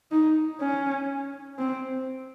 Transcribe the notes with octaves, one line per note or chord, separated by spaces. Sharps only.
D#4
C#4
C4